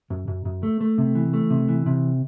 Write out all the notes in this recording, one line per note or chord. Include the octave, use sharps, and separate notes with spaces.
F#2
F#2
F#2
A3
A3
C3
E3
A3
C3
E3
C3